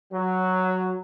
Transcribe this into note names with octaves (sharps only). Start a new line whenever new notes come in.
F#3